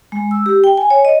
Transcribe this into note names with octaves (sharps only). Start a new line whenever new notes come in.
G#3
E6
G4
G5
G#5
C#5
D#5